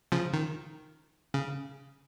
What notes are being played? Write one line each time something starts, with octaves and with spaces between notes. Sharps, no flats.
C#3 F3
D#3
C#3